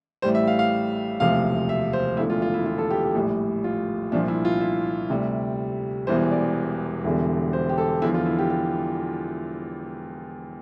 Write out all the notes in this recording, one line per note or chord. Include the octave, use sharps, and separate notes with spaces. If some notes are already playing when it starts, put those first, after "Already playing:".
A1 A2 G3 C5
E5
F5
F5
E1 D2 C3 F3 F5
E5
C5
E1 D2 D3 F3 E4
F4
F4
E4
F4
A4
G4
G4
A#1 A2 G3
F4
C2 A#2 F3 D4
E4
F4
E4
D2 C3 G3
E1 E2 E3 G3 C5
D5
E1 E2 D3 G3
C5
G4
A4
E2 D3 F3 E4
F4
E4
G4
G4